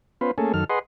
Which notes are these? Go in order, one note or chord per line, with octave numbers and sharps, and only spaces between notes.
B3 C#4 F4 B4 C5
A3 A#3 C#4 G#4 A4
F#2 D#3 A4 F6
G#4 B4 D#5 F#5 C6